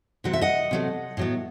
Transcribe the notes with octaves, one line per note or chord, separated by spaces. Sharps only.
C3 F#3 C4 F#5
E5
D#5 F#5
C3 F#3 A3
A2 F#3 B3